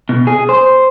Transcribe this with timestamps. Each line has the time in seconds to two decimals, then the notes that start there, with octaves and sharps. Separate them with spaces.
0.09 B2
0.27 G#4
0.49 C5